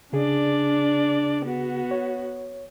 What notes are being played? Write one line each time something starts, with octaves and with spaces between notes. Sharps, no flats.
C#3 D4 G#4 D5
B3 F#4
C#5